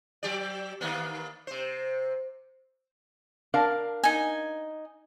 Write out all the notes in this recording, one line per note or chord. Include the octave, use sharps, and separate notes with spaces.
F#3 G4 D5
D#3 A#3 B3
C3 C5
D4 A#4 F5
D#4 G#5